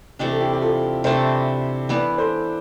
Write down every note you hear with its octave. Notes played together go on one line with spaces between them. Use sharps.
C3 E3 A3 D4 G4
A4
E4 G4
G4
F4 A4
C3 E3 A3 D4 A4 C5
E3 B3 E4 B4 D5
A4 C5